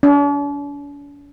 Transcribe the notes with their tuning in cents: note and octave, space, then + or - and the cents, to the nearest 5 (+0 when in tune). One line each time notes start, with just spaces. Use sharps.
D4 -45